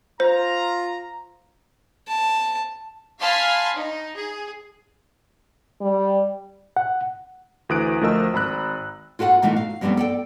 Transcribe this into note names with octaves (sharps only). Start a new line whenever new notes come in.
F4 C5 A#5
A5
F5 G#5 A5 B5 C6 F6
D#4
G#4
G3
F#5
D2 E3 D#6 F#6 D7
D2 F3 A3 A#4 D#5 E6
G#1 A#5 B5 F#6
F4 F#4 A4 F5 F#5
A#2 E3 A3 D#4 F4 F#4
F5
F#2 F3 G3 A3 B3 C4
A4 D5 G5